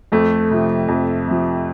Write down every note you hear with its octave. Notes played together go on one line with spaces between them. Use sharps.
F2 A3
C3 F3
F2
C3 F3